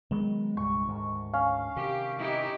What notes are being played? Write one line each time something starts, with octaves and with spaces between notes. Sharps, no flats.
D#3 F#3 G#3 B3
C2 G2 A#2 C#6
D2 G#2 D#3
C#4 F5
C3 D#3 G4
D#4 E4 G4